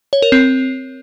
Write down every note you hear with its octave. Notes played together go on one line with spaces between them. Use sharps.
C#5
A#4
C4